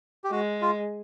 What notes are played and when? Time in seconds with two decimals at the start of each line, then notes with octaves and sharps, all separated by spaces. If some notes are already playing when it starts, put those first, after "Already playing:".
0.24 G4
0.31 G#3 F#4
0.62 F4